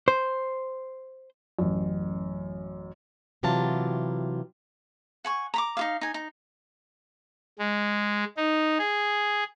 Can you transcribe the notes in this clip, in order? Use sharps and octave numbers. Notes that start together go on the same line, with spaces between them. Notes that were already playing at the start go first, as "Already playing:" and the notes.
C5
A1 F#2
C3 E3 F#3 F4 G4 A5
F#5 G#5 C#6
A#5 B5 D6
D#4 F4 F5
D#4 G#5
D#4
G#3
D#4
G#4